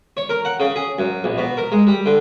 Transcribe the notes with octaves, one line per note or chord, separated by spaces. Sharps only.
C#5
A#4
F#5
C#3
G#4
F#2
A#1
B2
A#4
G#3
G3
D3